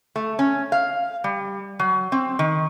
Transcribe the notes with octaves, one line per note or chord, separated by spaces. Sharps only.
A3
C#4
F5
G3
F#3
C4
D#3